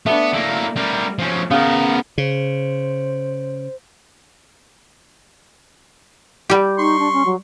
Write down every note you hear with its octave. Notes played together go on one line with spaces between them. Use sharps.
A3 B3 D4
A#3 E4
G3 A#4
F3 C#4
C#3 B3 A#4
C#3 C5
G3 G4
D#4 C6 C#6
D4
C#4
F#3